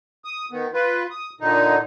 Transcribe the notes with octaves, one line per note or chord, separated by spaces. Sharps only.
D#6
D#3 B3
F4 B4
D#6
A#2 D3 D#4